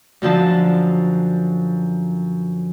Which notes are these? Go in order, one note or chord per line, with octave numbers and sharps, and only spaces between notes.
F#2 D3 F3 A5